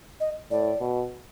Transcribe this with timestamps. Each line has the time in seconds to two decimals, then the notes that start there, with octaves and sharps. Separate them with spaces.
0.20 D#5
0.51 A2 D5
0.80 B2